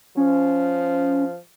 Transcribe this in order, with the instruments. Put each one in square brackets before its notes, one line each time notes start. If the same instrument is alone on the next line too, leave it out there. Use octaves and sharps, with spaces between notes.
[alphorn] F3 [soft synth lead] C#4